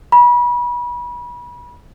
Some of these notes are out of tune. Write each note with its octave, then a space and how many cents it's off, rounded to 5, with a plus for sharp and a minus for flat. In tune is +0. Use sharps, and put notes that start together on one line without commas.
B5 -30